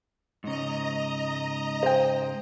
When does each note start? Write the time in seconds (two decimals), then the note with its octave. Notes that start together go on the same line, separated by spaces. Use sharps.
0.44 G#2 C#3 D#5 A#5
1.83 C5 G5